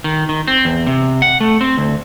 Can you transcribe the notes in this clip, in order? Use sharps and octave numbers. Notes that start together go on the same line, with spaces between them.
D#3
D#3
C4
E2
C3
F#5
A3
C4
D2